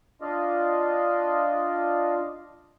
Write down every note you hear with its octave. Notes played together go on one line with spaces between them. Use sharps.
D4 F4 D5 D#5 F5